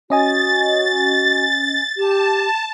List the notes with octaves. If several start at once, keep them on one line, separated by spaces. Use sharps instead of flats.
C#4 F#4 D#5 G#5 A6
G4 A5